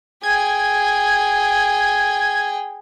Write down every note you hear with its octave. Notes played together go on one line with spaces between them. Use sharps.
G#4 G5 G#6